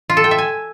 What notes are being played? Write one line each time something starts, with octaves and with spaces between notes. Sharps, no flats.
F4
A4
G5
E5
G#5